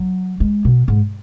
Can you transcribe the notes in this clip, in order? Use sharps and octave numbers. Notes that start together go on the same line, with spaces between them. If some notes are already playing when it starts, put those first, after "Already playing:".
Already playing: F#3
G#3
B2
G#2